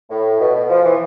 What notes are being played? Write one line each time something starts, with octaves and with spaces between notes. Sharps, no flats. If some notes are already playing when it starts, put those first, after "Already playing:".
A2
B2
B2
F3
E3